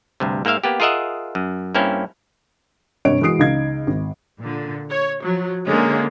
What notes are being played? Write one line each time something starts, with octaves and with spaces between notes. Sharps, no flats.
D2 G2 C3
G#2 A#3 A#4 E5 F5
A#3 B3 G4
F4 G#4 A#4 D#5 E5 F#5
F#2
G2 A#3 C4 C#4 E4
G2 C3 C#5 D7
E3 G#3 F#4 D#6 C7 D7
C#2 D#4 F5 G#6
G#1
A#2 D3
C#5
F3 F#3
D3 G#3 A#3 C#4